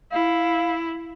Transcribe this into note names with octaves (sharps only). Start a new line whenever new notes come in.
E4 F5